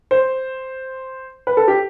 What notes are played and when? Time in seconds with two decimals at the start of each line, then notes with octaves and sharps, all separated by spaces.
0.11 C5
1.47 B4
1.57 A4
1.68 G4